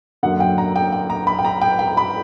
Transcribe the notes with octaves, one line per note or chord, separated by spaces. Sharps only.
F#2 D3 A#3 F#5
G5
A#5
G5
G5
A#5
B5
G5
A#5
G5
G5
B5